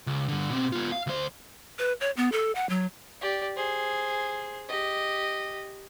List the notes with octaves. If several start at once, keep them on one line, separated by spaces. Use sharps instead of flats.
C#2
G2 D3
B2 C4
B3 F4
F5
D2 C5
B4
C#5
B3
A4
F#5
F#3
G4 D5
G#4 C5
G4 D#5